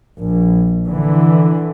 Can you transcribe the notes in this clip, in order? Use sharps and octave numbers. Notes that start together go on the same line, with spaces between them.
A#1
D3 E3